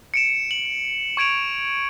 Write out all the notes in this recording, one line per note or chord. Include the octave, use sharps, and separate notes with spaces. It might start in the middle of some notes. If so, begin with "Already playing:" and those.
C#7 D7 E7
F#7
C#6 G#6 D7 F7